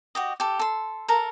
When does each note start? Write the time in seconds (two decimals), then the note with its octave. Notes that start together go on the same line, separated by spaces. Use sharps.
0.15 F#4 G4 D#5
0.40 G4 A4
0.59 A4 C6
1.08 A4 A#4 A#5